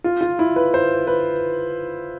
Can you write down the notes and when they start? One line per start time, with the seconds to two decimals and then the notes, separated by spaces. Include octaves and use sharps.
0.04 F4
0.21 F4
0.39 E4
0.56 B4
0.74 C5
1.07 B4